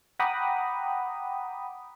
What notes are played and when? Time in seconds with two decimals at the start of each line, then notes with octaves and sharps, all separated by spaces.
0.19 F#5 G5 A#5 B5 D6 D#6